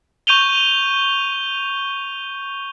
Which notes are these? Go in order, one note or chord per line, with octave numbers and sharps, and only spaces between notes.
C#6 G6 D#7 F7 G7